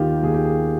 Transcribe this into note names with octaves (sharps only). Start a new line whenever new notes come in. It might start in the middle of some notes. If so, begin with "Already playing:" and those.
Already playing: D#2 D#3 D#4 F4 G4
D#2 G#4
G4
G#4